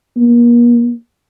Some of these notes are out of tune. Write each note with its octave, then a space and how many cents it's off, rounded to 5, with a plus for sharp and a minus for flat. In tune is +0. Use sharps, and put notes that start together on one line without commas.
A#3 +35